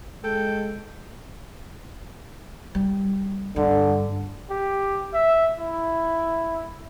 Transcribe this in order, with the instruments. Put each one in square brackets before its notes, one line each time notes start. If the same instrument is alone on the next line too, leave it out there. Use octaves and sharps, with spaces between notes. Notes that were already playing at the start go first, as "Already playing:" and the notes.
[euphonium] G#3 [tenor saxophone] A4 [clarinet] G5
[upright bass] G3
[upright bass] G2 [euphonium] D3
[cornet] G4
E5
E4